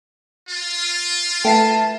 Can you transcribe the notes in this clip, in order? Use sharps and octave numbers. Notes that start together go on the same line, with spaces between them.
F4
A3 B4 E5 G5 A5 C7